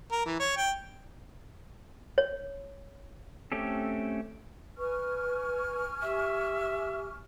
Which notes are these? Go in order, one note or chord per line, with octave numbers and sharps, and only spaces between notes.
A#4
E3
C#5
G5
C#5
A3 C4 C#4 G4 A4
B4 G#5 C#6 F6
G4 E5